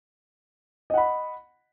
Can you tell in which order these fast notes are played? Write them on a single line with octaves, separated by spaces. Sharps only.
D#5 F#5 B5